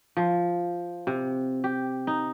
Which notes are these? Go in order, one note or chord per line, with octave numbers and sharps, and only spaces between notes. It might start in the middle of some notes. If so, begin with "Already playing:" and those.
F3
C3
G4
D#4